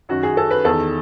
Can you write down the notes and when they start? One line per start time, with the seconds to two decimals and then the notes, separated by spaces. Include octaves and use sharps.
0.09 F#2 D#3 F#4
0.23 G#4
0.37 A4
0.51 B4
0.64 E2 D#3 A4